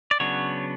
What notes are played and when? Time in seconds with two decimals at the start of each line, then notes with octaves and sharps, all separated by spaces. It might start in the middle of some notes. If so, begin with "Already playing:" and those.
0.11 D5
0.20 C#3 F#3 B3 D4 C#5